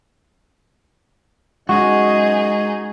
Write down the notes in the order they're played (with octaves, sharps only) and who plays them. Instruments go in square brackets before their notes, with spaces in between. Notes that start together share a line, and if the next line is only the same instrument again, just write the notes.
[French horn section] F#2 C#5 D#5 [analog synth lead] G#3 [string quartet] D#4 G#4 [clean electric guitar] F#4